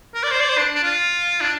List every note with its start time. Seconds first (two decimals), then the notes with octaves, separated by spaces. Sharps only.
0.15 A#4
0.23 D5
0.32 C5
0.41 D5
0.49 C5
0.58 D4
0.75 D4
0.83 F4
1.41 D4